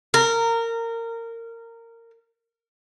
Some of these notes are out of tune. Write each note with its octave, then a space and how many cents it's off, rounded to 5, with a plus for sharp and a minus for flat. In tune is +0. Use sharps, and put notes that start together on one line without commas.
A#4 -20